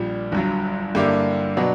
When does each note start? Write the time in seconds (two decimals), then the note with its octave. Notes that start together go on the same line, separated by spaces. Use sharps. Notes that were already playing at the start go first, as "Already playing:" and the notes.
Already playing: A#1 A#2 G3
0.32 G1 G2 F#3
0.95 G2 D3 A#3 E4 G4
1.57 B2 F#3 B3 D4